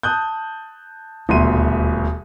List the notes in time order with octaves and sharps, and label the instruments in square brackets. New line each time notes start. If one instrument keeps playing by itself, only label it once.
[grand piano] A5 D#6 F#6 G6
D#1 D2 B2 E5 C6 D#7